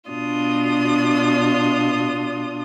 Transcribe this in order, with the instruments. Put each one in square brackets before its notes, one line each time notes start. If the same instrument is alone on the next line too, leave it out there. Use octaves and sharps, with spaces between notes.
[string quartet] B2 D4 F4 D#6